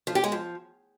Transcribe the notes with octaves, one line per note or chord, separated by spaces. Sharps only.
F3
G4
G#3
F3